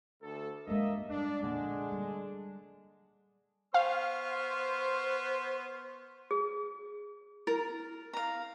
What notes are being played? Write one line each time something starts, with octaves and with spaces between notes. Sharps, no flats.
D2 A4
G2 G#3 A#3 D#5 E5
G2 D4
A#1 F2 D3 G#3 D4
G3
B3 C5 F5 C#6 F6
G#4
E4 A#4
F5 A#5